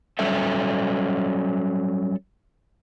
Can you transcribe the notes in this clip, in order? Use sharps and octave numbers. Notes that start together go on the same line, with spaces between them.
F#3 G3 C#4 A4 E5